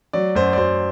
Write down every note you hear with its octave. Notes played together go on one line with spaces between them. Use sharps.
F#3 D5
F#2 C5
D5
F#2 C5